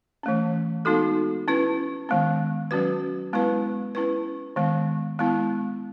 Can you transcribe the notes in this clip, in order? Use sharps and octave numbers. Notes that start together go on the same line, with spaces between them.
E3 A3 C#4
G#3 B3 D#4 F#4 A4
C#4 E4 B4
D#3 G#3 B3
F#3 C#4 F#4 B4
G#3 B3 E4 B4
C#4 E4 B4
D#3 G#3 B3
G#3 B3 E4